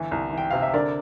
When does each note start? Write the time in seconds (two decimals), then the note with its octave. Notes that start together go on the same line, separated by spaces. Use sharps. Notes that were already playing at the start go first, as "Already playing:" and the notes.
Already playing: G1 E3
0.11 C2
0.33 E3 G5
0.50 C3 F5
0.62 E5
0.74 D3 A#4 D5